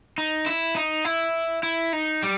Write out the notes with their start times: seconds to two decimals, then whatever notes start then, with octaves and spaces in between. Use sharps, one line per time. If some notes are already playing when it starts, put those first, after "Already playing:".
0.18 D#4
0.46 E4
0.76 D#4
1.05 E4
1.63 E4
1.93 D#4
2.23 G3